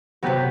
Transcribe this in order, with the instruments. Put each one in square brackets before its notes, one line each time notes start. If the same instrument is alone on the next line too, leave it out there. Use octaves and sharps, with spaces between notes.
[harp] C3 F#3 B3 G4 B4